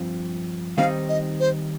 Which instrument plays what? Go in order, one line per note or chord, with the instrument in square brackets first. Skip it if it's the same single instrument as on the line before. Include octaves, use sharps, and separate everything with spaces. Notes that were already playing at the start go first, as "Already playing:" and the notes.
Already playing: [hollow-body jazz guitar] G2 F3 C4
[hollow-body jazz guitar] D#3 G3 C4 D#4 [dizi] F5
[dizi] D#5
C5